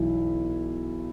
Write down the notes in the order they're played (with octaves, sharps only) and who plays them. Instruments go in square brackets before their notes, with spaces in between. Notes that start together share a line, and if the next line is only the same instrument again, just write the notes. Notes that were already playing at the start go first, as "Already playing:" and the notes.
Already playing: [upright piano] B1 E3 E4